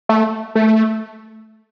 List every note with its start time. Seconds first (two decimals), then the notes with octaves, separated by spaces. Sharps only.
0.09 A3
0.55 A3